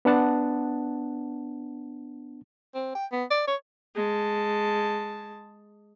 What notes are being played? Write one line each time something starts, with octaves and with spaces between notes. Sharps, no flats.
B3 D4 F#5 A5
C4
G5
B3
D5
C#5
G#3 A5